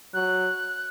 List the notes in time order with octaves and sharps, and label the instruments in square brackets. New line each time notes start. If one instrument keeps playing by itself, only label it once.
[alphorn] F#3 [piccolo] F#6